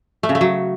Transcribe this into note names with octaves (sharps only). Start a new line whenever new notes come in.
A3
C#3
A3
F#3